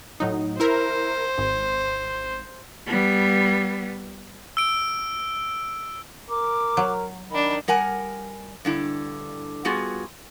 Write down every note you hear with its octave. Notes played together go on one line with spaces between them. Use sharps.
A2 F#3 D#4
E4 A#4 C5
G#1
G3 B3
E6 D7
A#4 D6
F#3
D#3 D4 D#4 B5
G3 A#4 F#5 G#5
G2 D3 E4
G3 B3 F4 F#4 G#4